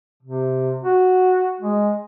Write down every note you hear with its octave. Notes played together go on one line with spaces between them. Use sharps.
C3
F#4
G#3